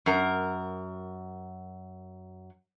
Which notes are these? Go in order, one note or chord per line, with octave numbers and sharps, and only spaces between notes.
F#2 A#4